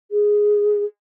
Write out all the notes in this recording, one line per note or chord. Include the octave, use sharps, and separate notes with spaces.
G#4